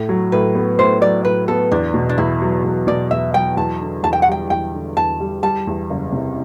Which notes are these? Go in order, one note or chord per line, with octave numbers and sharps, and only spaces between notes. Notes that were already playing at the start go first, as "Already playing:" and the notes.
Already playing: A2
F#3
A2 B4
B3
A2 C5
F#3 D5
A2 B4
B3 A4
E2 D4
B2
D4
E2 E4
F#3
E2
B2 D5
E2 E5
F#3 G5
E2 A5
D3
E2 A5
G5
F#5
G3 G5
E2 G5
D3
E2 A5
G3
G3 A5
E2
F#1
C3